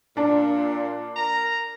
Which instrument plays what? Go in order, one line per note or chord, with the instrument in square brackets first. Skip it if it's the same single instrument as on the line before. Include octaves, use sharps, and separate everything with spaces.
[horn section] A#2 [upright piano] D4 A5
[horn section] A#4 A#5